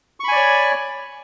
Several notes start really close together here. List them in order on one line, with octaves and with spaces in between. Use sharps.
C#6 B5 G#5 D5 C#5